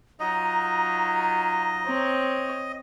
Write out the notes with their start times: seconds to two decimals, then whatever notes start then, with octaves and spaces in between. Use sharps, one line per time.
0.20 F#3 D#4 F4 D#5 A#5
1.86 C4 C#5